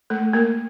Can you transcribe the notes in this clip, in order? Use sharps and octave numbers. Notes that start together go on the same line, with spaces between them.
A3 A4
A#3 A#4